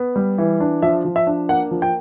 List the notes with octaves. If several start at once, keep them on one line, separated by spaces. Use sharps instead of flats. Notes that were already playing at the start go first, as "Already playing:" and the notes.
Already playing: B3
G3
E3
D4
F3 E5
F3
E5
D4
A#3 F#5
F3
G5